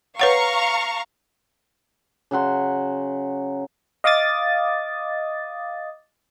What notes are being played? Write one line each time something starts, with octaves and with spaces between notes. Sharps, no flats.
B4 C#5 F5 F#5 A#5 C#6
C#3 F#3 F#5 C6
D#5 F5 D6 D#6 A6